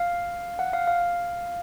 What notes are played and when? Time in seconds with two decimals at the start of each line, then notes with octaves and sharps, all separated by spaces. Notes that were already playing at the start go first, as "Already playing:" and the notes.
Already playing: F5
0.59 F#5
0.73 F5
0.88 F5